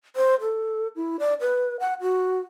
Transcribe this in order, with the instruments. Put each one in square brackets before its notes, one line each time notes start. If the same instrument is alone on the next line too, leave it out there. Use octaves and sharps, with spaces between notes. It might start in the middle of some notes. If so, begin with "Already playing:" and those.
[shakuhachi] C5
A4
E4
D5
B4
F#5
F#4